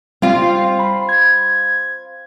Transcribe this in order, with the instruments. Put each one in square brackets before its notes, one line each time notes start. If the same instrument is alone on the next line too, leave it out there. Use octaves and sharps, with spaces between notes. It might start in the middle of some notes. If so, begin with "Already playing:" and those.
[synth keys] G3 [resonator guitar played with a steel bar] C4 F4
[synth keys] B5
G#6